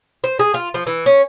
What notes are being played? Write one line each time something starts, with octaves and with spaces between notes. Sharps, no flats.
C5
G#4
F4
F3
E3
C#4